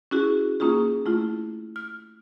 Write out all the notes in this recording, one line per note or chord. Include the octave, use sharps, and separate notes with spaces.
C#4 E4 F#4 G#4
A#3 C#4 D#4 F4 G#4
A3 E4 F4
F6